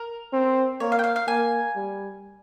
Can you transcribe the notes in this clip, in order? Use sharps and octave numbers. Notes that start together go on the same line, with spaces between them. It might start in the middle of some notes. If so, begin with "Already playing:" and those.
Already playing: A#4
C4
A#3 C#5
F5
G5
F5
F5
A#3 G#5
G3